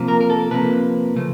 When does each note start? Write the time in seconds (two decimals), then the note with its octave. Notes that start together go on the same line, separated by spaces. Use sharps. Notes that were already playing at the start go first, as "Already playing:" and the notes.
Already playing: C3 F3 A#3
0.08 A#4
0.21 A#4
0.30 A4
0.51 C3 F3 A#3 B4
1.16 C#3 F3 A3